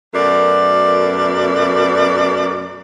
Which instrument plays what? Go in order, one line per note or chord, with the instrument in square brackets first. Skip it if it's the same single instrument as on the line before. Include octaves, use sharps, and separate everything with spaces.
[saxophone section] F#2 B2 A3 A#4 D5